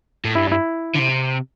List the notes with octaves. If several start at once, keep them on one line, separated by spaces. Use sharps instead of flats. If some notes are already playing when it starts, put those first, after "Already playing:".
A2
G2 E4
E4
D3
C3